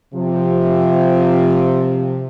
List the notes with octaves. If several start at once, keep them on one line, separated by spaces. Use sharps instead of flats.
C3 F3